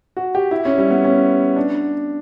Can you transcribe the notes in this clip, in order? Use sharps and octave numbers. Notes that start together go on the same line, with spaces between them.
F#4
G4
E4
C#4
G3
B3
C#4
D4